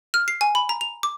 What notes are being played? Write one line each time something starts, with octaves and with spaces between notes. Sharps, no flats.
F6
C7
G#5
B5
A#5
F7
D6